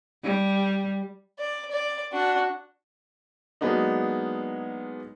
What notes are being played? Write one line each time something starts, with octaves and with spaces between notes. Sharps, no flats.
G3
D5
D5
D4 F#4
F#3 G#3 A#3 B3 D4 D#4